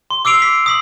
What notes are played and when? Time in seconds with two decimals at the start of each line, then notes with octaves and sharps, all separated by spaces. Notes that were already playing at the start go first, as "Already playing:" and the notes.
0.11 C6
0.25 D6 E6 C7 D7 F7
0.42 B6
0.66 D#6 B6 F#7